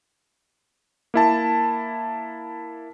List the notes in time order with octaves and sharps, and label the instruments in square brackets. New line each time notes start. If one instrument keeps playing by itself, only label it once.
[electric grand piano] A#3 E4 A5